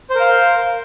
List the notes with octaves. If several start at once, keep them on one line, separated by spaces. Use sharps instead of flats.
A#4 C5 F5